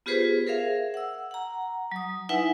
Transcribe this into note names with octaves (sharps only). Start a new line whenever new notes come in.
B3 F4 G4 G#4 B4 C5
G#4 A#4 C5 E5 F5
F#5 E6
F#5 A#5
F#3 D#6
D#4 E4 B4 E5 F#5 G#5